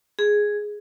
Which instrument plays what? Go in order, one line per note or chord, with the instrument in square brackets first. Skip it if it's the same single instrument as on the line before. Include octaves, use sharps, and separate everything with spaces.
[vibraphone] G#4